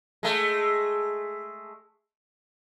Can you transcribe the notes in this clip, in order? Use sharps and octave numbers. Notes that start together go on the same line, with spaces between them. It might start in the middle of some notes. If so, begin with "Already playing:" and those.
G#3 A3